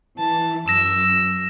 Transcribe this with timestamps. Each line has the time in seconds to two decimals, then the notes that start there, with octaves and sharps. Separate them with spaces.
0.18 E3 A5
0.68 F#2 E6 A#6 E7